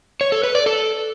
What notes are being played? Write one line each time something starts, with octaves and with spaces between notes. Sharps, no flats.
C#5
A4
B4
D5
A4